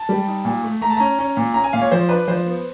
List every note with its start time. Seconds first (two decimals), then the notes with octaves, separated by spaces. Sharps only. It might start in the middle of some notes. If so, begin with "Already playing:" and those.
Already playing: A5
0.09 G3
0.27 D#4
0.45 A#2
0.64 A3
0.81 A3 A#5
0.90 A5
0.97 C#4 A#5
1.19 C#4
1.37 A#2
1.54 C#4 A#5
1.64 G#5
1.73 A#2 F5
1.81 C#5
1.91 F3 C5
2.09 D4 B4
2.28 F3 C5
2.46 B3